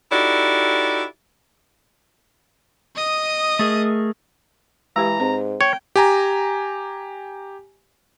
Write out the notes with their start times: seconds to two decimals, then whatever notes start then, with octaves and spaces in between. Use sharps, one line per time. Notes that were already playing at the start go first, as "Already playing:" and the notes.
0.12 D#4 E4 F#4 G4 A4 D5
2.95 D#5 D#6
3.59 A3 G#4 A#4
4.96 E3 G#3 G4 B4 A#5
5.20 G#2 C4
5.61 C#5 G5
5.96 G4 G#5 A#5